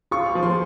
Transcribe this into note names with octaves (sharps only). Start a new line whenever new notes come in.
F4 C#6
F3
C6